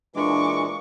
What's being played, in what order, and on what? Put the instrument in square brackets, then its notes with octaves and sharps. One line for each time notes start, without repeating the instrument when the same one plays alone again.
[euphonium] A#2 [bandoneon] E3 G#3 [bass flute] D4 [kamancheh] C#6 D6